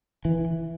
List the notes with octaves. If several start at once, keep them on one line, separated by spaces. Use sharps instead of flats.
E3